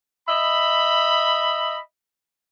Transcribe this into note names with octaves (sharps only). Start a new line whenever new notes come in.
D#5 E5 B5